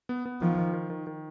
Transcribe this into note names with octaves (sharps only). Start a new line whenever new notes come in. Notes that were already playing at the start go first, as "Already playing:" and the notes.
B3
B3
D#3 F3
D#3
D#3
D#3
D#3